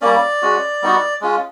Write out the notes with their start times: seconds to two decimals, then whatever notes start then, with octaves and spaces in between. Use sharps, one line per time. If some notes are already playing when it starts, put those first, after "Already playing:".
0.01 G3 A#3 C#4 D5
0.42 G#3 C#4 F#4
0.82 G3 B3 D#4 F#4
1.21 G#3 C#4 F4